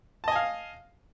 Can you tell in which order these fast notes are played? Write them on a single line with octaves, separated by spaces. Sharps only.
A5 D#5 G#5 F5